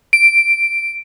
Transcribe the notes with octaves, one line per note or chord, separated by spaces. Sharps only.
D7